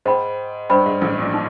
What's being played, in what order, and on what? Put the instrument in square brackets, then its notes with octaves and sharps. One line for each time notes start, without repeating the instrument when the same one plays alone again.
[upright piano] G#2 [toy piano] C5 D#5 G5 B5
[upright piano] G2 [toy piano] C5 D#5 G5 B5
[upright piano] G#2
A1 A2
A#1 A#2
[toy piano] D#4